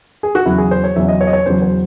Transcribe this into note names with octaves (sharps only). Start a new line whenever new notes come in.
G#4
F#4
E2 C#3 F#3 E4
G#4
C5
C#5
E2 C#3 F#3 E5
D#5
C#5
D#5
C#5
E2 C#3 F#3 C5
C5